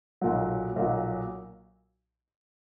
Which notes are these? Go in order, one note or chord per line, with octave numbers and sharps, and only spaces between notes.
B1 A#2 F#3
B1 A#2 F#3